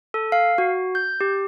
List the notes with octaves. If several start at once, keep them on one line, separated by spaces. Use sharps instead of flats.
A4
F5
F#4
G6
G4